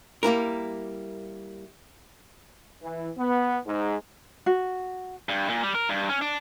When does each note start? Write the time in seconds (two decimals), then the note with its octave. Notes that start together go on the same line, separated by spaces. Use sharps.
0.23 G3 A#3 E4 A#4
2.81 E3
3.17 B3
3.65 G#2
4.46 F#4
5.29 G2
5.50 A#2
5.63 G3
5.75 A#4
5.89 G2
6.09 C#4
6.21 D4